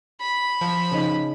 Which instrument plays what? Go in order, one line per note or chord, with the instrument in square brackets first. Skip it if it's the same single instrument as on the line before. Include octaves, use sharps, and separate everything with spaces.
[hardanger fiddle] B5
[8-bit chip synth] F3
[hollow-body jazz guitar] C#3 D#4